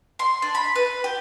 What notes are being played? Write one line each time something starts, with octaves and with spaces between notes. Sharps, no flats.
C6
D4
B5
B4
G4